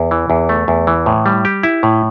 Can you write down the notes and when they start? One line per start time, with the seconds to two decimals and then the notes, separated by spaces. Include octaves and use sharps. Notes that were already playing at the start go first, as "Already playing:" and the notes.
Already playing: E2
0.11 E3
0.30 E2
0.49 A3
0.68 E2
0.87 E3
1.06 A2
1.26 G3
1.45 G4
1.63 E4
1.83 A2